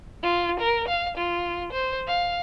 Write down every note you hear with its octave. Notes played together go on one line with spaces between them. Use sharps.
F4
A#4
F5
F4
C5
F5